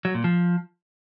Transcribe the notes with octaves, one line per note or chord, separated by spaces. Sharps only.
F#3
A#2
F3